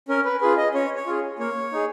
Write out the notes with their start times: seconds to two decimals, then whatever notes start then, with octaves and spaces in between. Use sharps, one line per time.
0.08 C#4 A#4
0.25 B4
0.41 F4 G#4 B4
0.57 D#5
0.74 C#4 C#5
0.96 C#5
1.06 F4 G#4
1.39 A#3 C#5
1.72 D#4 G#4